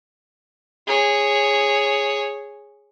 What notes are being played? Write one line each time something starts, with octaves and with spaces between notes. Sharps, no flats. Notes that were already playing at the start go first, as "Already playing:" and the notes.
G#4 C#5